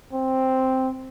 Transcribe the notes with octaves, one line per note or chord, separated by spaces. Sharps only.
C4